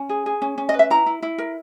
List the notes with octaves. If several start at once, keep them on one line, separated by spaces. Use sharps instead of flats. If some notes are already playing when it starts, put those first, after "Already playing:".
Already playing: C#4
G#4
G#4
C#4
C#4
D#5
B4
E5
E4 A#5
E4
E4
A#4